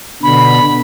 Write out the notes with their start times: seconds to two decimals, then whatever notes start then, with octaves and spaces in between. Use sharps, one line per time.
0.23 B2 D3 B5